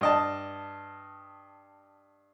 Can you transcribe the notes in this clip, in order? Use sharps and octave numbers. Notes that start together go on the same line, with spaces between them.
G2 D#5 A5